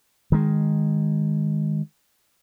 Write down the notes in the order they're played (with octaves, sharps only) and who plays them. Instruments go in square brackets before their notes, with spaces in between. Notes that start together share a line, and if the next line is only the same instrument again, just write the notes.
[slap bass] D#3 G#3